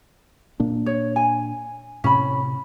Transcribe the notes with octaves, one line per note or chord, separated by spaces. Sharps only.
A#2 A#3 D4
C#5
G#5
A2 C3 C#4 B5